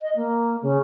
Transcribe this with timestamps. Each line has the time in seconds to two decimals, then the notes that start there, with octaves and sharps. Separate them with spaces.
0.02 D#5
0.16 A#3
0.62 C#3